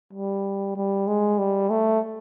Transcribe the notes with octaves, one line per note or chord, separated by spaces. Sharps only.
G3
G3
G#3
G3
A3